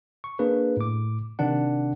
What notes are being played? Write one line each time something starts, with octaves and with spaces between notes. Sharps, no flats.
C#6
A#3 D4 G#4 B4
A2 D6
C3 D#3 D4 F#5